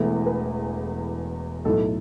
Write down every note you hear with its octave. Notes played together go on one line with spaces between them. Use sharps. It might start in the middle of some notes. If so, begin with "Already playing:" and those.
Already playing: E1 E2 E3 A3
B4
B1 A2 A3 A4